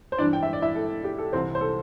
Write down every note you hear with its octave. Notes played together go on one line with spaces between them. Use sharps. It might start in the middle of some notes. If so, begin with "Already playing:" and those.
C5
G2 E3 D4 D5
G5
E5
D5
E4 E5
A4
G4
A4
C2 C3 E3 C4 C5
C5
A4